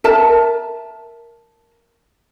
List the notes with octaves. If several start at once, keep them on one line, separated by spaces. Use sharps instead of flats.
A#4 E5 A5